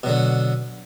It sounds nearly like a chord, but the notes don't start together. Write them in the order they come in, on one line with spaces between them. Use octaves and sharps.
B2 F#3 D3